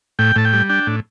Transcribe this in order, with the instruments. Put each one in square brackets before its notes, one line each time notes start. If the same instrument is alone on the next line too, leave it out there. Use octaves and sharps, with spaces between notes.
[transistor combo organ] A2 G5
A2 A5
G5
G3
D4 G5
A2